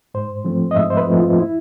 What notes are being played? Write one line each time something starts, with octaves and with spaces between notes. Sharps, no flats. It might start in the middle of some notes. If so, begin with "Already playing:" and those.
G#2 C5
F3 A3 C4
D#5
G#2 E5
C5
B4
F3 A3 C4
F4
E4